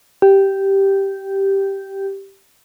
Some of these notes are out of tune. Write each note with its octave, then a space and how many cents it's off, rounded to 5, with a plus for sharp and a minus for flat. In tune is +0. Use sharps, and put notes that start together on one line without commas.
G4 -5